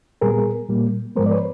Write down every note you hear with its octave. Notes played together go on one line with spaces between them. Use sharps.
A#2 G3 B3 G#4 A#4
A#2 G3 A#3
G#2 F3 G#3 B3 A#4 C5
D5
B4 C#5